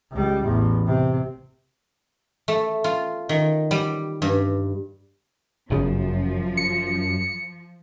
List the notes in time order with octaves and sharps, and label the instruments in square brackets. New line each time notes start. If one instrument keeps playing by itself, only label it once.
[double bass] C#2 G3
A1 E2
C3
[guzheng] A3
F4
D#3
G3
G2
[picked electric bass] G1 C#3 [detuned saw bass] F#2 [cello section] F3
[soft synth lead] C#7